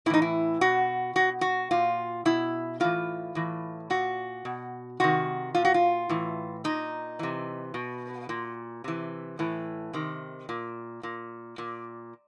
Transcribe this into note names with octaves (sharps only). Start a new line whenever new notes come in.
A2 E3 D#4 E4
E4
B2 F#4
B2 F#4
F#4
A#2 F4
B2 E4
A2 E3 F4
A2 E3
A#2 F#4
B2
C3 D#3 F#4
A#2 F4
F#4
F4
A2 E3
A#2 D#4
C3 E3
B2
A#2
C3 E3
A2 E3
C3 D#3
A#2
A#2
A#2